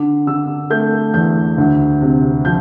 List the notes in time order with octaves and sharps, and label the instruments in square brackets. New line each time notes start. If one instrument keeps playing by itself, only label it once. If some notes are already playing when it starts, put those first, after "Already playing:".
Already playing: [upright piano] D3 D6
D3 E6
A3 G6
E2 G6
D2
C3
F3 G6